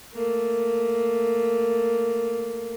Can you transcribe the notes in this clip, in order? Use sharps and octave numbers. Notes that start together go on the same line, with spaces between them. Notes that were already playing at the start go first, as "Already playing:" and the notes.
A3 A#3